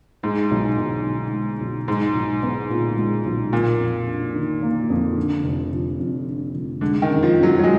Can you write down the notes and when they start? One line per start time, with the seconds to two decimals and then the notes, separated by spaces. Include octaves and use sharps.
0.23 G#2 G#3
0.51 B1
0.78 B1
1.06 B2
1.32 G#3
1.60 B1
1.88 G#2 G#3
2.15 B1
2.43 B3
2.70 A#2
2.97 G#3
3.25 B1
3.53 A#2 A#3
3.79 F2
4.07 D4
4.35 D#3
4.63 A#3
4.90 F2
5.17 D3
5.44 F1
5.71 F3
5.99 F2
6.27 D3
6.55 F1
6.81 D3 G#3
7.02 D#3
7.08 F#2
7.23 F3
7.36 F#2
7.43 F#3
7.59 F#3
7.63 G#3